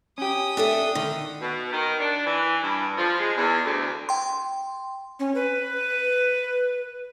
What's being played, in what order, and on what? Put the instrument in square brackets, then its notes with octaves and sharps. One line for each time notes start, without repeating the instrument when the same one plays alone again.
[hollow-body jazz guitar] C#4 G4 [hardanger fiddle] G5 D#6
[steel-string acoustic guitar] D4 A4 E5
[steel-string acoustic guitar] D3 [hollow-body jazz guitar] D#3
[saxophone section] B2
D#3
D4
E3
G2
F3
G#3
E2
D2
[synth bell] G5 C6
[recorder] C#4
B4